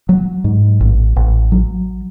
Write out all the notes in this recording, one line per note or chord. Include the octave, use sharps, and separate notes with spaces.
F#3
G#2
A1
A1
F#3